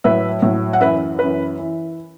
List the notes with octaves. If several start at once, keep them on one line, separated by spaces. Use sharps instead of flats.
A2 F#3 B4 E5
A2 F#3
F#5
F#2 E3 B4 E5
F#2 E3 B4
E3